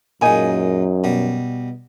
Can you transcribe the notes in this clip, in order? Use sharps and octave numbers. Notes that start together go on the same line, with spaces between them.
F#2 A#2 G#3 D#4 G#5 A#5
B2 G3